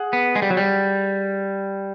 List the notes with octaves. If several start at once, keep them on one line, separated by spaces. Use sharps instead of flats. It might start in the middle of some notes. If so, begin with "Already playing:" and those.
Already playing: G#4 F#5
B3
G#3
G3
F#3
G3